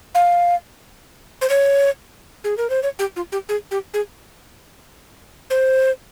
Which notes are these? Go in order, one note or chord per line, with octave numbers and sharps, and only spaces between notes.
F5
C5
C#5
G#4
A#4
C5
C#5
G4
F4
G4
G#4
G4
G#4
C5